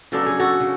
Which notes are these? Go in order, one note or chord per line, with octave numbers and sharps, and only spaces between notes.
C#3 F#3 B3 D4 A4
G#4
F#4 A4
C#3